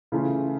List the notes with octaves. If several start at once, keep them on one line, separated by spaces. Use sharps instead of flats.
C#3 E3 A3 C#4 F4